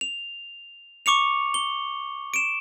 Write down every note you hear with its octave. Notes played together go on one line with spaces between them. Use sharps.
F7
C#6 D6 C#7 F7
G7
D7 E7